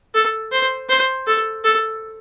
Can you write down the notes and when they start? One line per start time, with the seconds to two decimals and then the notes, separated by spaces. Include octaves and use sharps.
0.15 A4
0.52 C5
0.89 C5
1.27 A4
1.64 A4